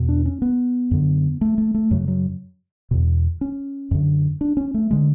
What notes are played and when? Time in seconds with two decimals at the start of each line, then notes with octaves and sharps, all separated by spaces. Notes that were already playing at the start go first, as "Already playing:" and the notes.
Already playing: E2 B2
0.09 D4
0.25 C#4
0.42 B3
0.91 F#2 D3
1.41 A3
1.58 A3
1.74 A3
1.91 F#2 C#3 F#3
2.08 F#3
2.91 E2 B2
3.41 C#4
3.91 F#2 D3
4.41 D4
4.57 C#4
4.74 A3
4.91 D3 G#3